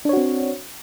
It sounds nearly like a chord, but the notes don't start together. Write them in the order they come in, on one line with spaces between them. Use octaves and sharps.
D4 C#5 F#4 C4